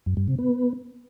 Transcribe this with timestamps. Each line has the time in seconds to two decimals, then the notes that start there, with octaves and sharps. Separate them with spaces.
0.06 F#2
0.17 G2
0.28 C3
0.38 B3